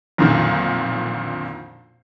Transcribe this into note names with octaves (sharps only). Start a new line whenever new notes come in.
B1 F2 A#2 D3 D#3